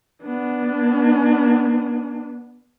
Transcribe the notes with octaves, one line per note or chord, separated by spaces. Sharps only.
B3 D4